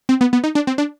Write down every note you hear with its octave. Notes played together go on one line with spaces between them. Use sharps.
C4
B3
B3
D#4
D4
C4
D4